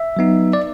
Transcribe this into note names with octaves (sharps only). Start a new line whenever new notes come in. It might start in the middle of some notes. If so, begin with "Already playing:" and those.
Already playing: E5
F#3 B3 D#4
D5